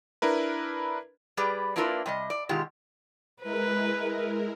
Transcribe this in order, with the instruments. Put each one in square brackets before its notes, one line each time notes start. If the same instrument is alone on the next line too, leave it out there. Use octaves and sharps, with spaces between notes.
[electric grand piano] D4 E4 A#4 B4
[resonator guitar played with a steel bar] G3 G4 G#4 B4 D5
A#3 D4 E4 F4 A#4 B4
C3 G3 D#5
D5
B2 D#3 G#3 F4 G4
[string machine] G#3 E4 A#4 [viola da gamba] B4